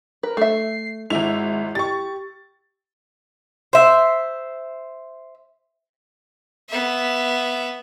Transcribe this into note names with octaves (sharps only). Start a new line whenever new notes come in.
A#4 B4
A3 E5 C7
G#1 G#3 E4 E5 F7
G4 C#6 A6
C5 E5
B3 E5